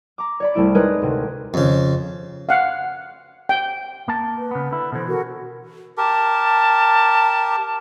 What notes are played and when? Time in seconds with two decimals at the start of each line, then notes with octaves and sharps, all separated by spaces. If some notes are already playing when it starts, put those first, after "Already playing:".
0.18 A#5 D6
0.40 C#5 D5 B5
0.54 C2 A3 E4 D7
0.75 G#3 D#4 G#4 A#4 B4 C#5
1.02 D2 C3
1.54 F2 C#3
2.49 F5 F#5
3.49 G5
4.08 A#3 A5
4.36 B4
4.51 C#3 B3
4.71 D3 E4
4.92 B2 D3 E3 A4 C5
5.07 F#4 A4 A#4
5.97 G4 A#4 A5